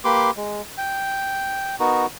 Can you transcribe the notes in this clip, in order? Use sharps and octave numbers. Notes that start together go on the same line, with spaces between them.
A#3 G4 B4 C6 D6
G#3
G5
B3 D#4 F#4 A#4